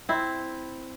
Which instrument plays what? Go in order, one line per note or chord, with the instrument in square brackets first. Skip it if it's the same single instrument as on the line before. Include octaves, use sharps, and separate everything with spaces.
[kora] C4 E4